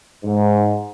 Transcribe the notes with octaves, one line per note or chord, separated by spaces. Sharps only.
G#2